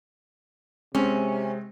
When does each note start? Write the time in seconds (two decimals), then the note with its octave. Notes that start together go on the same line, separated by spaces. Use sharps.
0.95 C3 G#3 C4 C#4